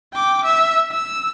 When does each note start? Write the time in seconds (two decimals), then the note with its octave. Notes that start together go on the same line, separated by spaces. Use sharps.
0.13 G5 D6
0.45 E5 E6
0.91 E6